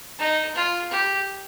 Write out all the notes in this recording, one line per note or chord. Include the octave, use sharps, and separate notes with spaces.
D#4
F4
G4